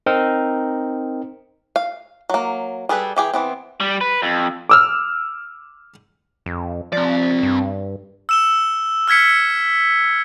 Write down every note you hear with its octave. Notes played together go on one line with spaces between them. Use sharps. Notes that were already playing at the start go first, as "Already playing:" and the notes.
C4 D#4 A#4
F5
F#3 A#3
G3 G#4 A4 B4
E3 G4 G#4
E3 B3 C4
G3
B4
F2
D6 E6 F6
F2
F3 C4 D5
G2
E6 E7 G7
E6 F6 G#6 B6 C#7